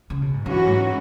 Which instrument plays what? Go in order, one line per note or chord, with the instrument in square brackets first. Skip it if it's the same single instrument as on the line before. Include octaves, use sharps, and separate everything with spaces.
[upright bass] C#3
B2
G#2
[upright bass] F#2 [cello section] E3 C#4 F#4
[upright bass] G#2